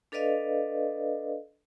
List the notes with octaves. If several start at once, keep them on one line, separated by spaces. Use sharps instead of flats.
D4 A4 B4 D5 D#5 F5